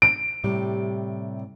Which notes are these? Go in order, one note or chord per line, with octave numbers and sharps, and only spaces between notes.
D7
A2 C3 G3